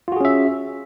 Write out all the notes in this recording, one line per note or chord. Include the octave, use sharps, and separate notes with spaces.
C#4 F4 F#4 G#4 E5